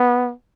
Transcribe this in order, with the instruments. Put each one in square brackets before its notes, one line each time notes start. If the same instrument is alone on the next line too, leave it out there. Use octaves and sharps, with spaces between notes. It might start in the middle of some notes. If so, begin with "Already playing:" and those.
Already playing: [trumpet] B3